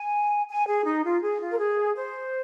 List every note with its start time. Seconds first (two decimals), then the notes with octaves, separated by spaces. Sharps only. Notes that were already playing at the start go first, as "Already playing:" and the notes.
Already playing: G#5
0.50 G#5
0.68 G#4
0.85 D#4
1.04 F4
1.23 G#4
1.41 F4
1.52 A#4
1.58 G#4
1.96 C5